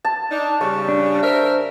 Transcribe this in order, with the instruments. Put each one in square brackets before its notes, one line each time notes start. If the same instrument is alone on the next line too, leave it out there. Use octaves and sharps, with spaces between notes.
[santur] A5
[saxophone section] D4 D#4
[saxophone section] C#3 G3 [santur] C#6
[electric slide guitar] D4
[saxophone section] A#4 E5 [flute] C5